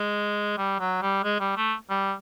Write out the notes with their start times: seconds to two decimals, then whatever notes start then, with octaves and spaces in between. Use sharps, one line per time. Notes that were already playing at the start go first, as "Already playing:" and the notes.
Already playing: G#3
0.58 G3
0.79 F#3
1.02 G3
1.24 G#3
1.40 G3
1.57 A3
1.90 G3